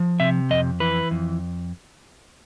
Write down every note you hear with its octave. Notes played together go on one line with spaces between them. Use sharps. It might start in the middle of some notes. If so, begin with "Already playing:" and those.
Already playing: F3
C3 E5
F2 D#5
E3 B4
F2